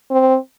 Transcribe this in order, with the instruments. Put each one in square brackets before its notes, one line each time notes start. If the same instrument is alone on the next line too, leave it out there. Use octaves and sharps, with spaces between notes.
[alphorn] C4